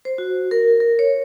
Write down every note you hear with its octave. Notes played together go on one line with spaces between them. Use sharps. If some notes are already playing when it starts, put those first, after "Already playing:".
C5
F#4
A#4
A#4
C#5